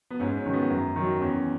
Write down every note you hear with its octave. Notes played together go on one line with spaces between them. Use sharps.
B3
G#2 C#4
C#4
D#3 F#3
B3
F#2
D#3 F#3
E2 C#4